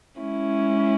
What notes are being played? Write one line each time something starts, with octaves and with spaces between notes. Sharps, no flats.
G#3 C#4 E4